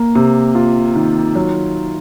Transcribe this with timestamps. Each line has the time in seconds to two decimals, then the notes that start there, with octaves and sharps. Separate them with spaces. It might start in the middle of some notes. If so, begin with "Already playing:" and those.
Already playing: A#3
0.15 C3
0.55 F4
0.96 D#3
1.35 F#3